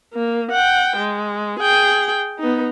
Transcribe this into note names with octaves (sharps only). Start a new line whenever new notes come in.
A#3
F#5 G5
G#3
G#4 G5
B3 D#4